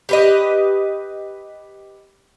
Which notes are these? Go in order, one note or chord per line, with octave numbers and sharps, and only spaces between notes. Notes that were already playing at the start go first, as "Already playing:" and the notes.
G4 B4 D#5